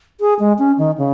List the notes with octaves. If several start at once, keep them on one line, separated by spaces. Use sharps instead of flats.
G#4
G#3
C#4
D#3
C#3